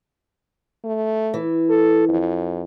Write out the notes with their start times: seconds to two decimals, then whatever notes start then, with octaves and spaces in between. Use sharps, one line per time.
0.84 A3
1.34 E3
1.69 A4
2.09 F2